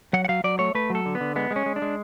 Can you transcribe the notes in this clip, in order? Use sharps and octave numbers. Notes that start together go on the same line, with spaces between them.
F#3 F#5
F#5
F#3 F5
F#3 D5
A3 C#5
A3 B4
F#3
A4
D3
B3
D3
G#3 B3
G#3
C#4
G#3
D4
G#3